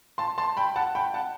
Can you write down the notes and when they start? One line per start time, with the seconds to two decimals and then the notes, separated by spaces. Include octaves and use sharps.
0.18 A5 C6
0.38 A5 C6
0.57 G5 B5
0.76 F#5 A5
0.95 G5 B5
1.14 F#5 A5